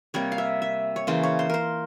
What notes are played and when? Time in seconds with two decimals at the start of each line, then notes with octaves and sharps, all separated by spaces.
0.14 C3 G3 A#3 C#5
0.32 F5
0.38 E5
0.62 E5
0.96 C#5
1.07 C#3 E3 A#3 C5
1.23 C#5
1.39 C5
1.50 A#4 C5